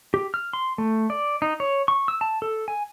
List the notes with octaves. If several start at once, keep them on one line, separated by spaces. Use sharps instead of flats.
G4
F6
C6
A3
D5
D#4
C#5
C#6
E6
A5
A4
G#5